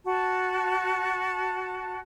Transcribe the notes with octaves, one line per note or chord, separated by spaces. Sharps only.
F#4 A5